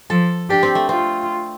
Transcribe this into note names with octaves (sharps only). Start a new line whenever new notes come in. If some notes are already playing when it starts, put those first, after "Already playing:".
F3 A4
D4 G4
C4
A3
C4 F4